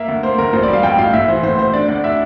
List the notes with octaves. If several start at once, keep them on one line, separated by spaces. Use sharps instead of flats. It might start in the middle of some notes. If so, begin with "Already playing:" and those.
Already playing: A#3 E5
D2
A#3 C5
D2 A#4
A1 C5
G3 D5
F5
A1 G5
A1 F5
A2 E5
E3 C5
A2 C5
A2 C5
D4 D5
D2 D5
D4 E5